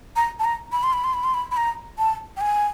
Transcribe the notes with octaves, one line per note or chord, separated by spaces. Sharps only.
A#5
A5
A#5
B5
C6
B5
C6
B5
C6
B5
B5
A#5
A5
G5
G#5